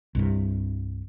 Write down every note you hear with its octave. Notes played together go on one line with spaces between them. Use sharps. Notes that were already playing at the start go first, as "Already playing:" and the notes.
C2 G2 C3